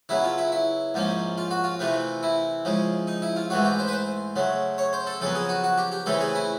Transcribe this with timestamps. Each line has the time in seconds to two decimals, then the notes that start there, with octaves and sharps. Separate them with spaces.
0.09 C#3 F#3 B3 E4
0.24 F4
0.38 E4
0.52 E4
0.94 G#2 F3 A#3 C#4
1.38 F4
1.51 F#4
1.64 F4
1.79 C3 E3 A3 C4
2.23 E4
2.65 C#3 F3 G#3
3.07 D#4
3.22 E4
3.36 F4
3.50 G#2 E3 A3 C4 F#4
3.64 G4
3.79 C5
3.88 B4
3.93 C5
4.36 C#3 F#3 A3
4.78 C#5
4.93 C5
5.07 A4
5.21 F2 C#3 F#3 B3 A4
5.35 G#4
5.49 F#4
5.64 F#4
5.78 G4
5.92 G4
6.06 C#3 E3 A3 C4 A4
6.21 G#4
6.35 E4